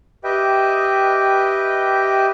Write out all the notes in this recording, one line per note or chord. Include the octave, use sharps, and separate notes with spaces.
G4 B4 D#5 E5 G5